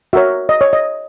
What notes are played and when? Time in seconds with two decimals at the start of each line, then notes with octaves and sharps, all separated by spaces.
0.13 F#4 A#4 C#5 E5
0.49 D#5
0.61 C#5
0.73 D#5